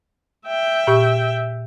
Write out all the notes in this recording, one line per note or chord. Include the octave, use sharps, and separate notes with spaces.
E5 G5
A#2 G4 C#6